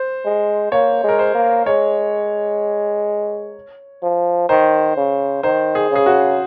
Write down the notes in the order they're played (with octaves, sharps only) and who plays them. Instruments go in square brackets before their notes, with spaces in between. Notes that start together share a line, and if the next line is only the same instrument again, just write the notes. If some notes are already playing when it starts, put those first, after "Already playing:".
Already playing: [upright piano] C5
[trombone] G#3
[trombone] A#3 [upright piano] C#5
[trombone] G#3 [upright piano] A#4
[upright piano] C5
[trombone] A#3
[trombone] G#3 [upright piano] C#5
[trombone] F3
[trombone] D#3 [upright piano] C5
[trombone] C#3
[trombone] D#3 [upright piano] C5
[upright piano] G#4
[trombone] C#3 [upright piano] G#4
[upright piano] F#4